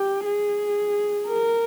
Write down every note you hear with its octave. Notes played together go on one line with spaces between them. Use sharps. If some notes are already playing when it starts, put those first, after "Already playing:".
Already playing: G4
G#4
A#4